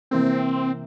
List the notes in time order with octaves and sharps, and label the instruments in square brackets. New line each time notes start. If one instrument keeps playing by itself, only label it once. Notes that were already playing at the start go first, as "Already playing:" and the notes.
[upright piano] C3 E3 A#3 [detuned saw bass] C4